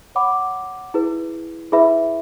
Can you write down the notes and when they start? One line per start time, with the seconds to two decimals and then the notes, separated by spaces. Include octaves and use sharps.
0.15 C#5 F#5 B5 D6
0.94 E4 G#4 B4
1.72 E4 G#4 B4 E5 B5